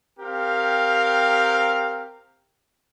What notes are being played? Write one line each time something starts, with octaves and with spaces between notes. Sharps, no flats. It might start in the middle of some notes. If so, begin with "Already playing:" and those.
C4 G4 A#4 F5